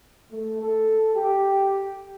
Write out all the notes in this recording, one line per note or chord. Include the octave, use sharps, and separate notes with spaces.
A3
A4
G4